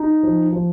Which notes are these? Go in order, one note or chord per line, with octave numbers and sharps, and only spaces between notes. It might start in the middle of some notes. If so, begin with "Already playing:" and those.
Already playing: D#4
F3
F3